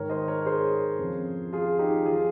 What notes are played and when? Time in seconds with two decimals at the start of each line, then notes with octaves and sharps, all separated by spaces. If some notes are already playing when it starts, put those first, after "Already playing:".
Already playing: G#2 D#3 A#4 C#5
0.10 C5 D#5
0.28 A#4 C#5
0.46 G#4 C5
0.99 F2 C#3 F3
1.53 F4 G#4
1.79 D#4 G4
2.06 F3 F4 G#4